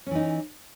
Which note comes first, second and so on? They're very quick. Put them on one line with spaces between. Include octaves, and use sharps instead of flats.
C#4 E3 D#4